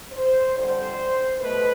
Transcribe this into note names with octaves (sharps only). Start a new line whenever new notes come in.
C5
F2 D3 G3 C5
B2 A3 B4